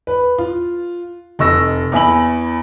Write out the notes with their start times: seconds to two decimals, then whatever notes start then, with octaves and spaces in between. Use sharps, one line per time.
0.07 B4
0.38 F4
1.39 F1 D#5 C#6 E6 A#6
1.92 E2 E5 G#5 B5 F#7